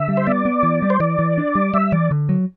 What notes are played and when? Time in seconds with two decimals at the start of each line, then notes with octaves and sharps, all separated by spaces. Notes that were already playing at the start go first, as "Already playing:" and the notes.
Already playing: D3 E5
0.08 G3
0.17 C5
0.27 B3 D5
0.45 B3
0.63 E3
0.82 G3
0.90 C5
1.00 E3 D5
1.19 E3
1.38 D4
1.55 G3
1.74 G3 E5
1.92 E3 D5
2.11 D3
2.29 F#3